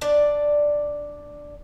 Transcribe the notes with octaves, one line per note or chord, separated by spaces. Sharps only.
D4 D5